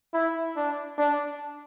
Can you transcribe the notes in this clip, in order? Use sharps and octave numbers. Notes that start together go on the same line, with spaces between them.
E4
D4
D4